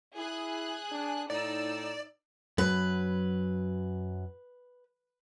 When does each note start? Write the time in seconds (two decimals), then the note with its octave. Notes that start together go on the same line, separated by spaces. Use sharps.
0.16 E4 G#4 F#6
0.92 D4
1.30 A2 D#4 D5 E6
2.58 F#2 F#3 B4